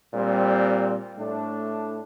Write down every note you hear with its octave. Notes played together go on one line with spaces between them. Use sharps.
A#2 G3 C4
A2 A3 D4